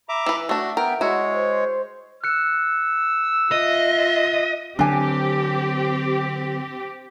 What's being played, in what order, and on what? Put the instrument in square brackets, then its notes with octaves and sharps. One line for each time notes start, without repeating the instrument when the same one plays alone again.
[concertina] E5 A#5 D6 [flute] B5
[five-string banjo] E3 B4
[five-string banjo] A3 D4 [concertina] F#4 [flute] E5
[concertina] B3 G5 [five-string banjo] A#4
[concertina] G#3 C#5 [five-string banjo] E4 F#4
[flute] C5
[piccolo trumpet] E6 [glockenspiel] F#6 C#7
[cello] F4 E5 [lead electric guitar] D#5
[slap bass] D3 F#3 [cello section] C4 G4 [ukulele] D4 G#5